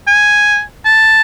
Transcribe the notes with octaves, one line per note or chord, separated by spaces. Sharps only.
G#5
A5